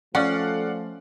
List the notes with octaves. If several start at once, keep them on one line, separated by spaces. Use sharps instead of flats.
F3 A3 C#4 A4 D5 F5 F#5